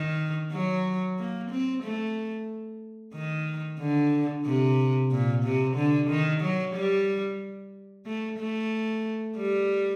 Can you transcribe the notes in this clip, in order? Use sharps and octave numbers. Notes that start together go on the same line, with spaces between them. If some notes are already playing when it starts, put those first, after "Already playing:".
Already playing: D#3
F#3
A#3
C4
A3
D#3
D3
C3
A#2
C3
D3
D#3
F#3
G3
A3
A3
G3